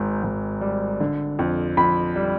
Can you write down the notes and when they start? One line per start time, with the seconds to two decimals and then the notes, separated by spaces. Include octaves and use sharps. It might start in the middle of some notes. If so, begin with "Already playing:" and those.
Already playing: G#1 G#2
0.24 G#1
0.61 G3
1.00 D3
1.39 F2
1.77 F2 B5
2.16 G3